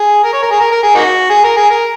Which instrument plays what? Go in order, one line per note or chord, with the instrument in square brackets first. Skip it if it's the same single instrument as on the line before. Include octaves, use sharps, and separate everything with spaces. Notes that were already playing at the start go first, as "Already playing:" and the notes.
Already playing: [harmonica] G#4
A#4
C#5
A#4
G#4
A#4
A#4
G#4
A#3 D#4 F#4
G#4
A#4
G#4
A#4